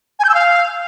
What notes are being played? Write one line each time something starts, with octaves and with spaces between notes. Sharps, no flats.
G#5
G6
E6
F5